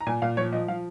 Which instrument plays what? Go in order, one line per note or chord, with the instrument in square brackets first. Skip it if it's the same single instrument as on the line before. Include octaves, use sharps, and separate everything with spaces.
[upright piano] A#5
A#2 G#5
A#2 F5
F3 C#5
F3 D#5
F3 F5